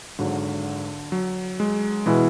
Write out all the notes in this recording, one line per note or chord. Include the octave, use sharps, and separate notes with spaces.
G#1 G#2 D3 F#3
F#3
G#3
B2 E3 G#3 B3 E4